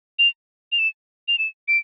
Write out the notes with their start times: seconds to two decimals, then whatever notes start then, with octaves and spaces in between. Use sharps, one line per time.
0.19 F7
0.72 F7
0.79 E7
1.28 F7
1.38 E7
1.68 D7